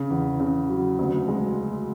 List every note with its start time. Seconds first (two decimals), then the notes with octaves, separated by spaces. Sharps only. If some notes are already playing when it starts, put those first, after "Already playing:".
Already playing: C#3
0.10 E2
0.40 C#3
0.69 F#3
0.99 D2
1.28 G#3